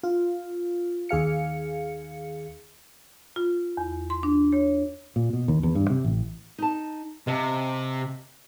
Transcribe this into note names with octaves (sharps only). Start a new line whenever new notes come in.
F4
D#2 G#4 F5 C#7
F4
E2
C6
D4
C#5
A#2
B2
D#2
E2
G2
C3
A1
D#4 A5
C3 D#5 F5 A5